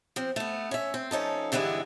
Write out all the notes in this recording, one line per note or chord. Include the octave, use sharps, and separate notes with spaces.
F3 C4
A3 B3
C#4 E5
C4
F3 C#4 D#4 A4
G2 D3 E3 G#3 B3 E4